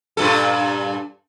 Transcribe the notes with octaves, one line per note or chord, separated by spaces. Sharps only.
G2 A#2 A4